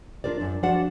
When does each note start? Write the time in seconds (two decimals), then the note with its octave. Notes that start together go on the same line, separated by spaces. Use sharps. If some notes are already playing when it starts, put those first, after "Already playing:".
0.24 D4 F4 A#4 C5 D5
0.40 F#2 D4
0.63 F3 D4 F#4 D5 F#5